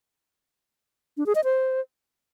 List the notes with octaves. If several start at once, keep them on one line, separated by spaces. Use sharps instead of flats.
D4
G#4
D#5
C5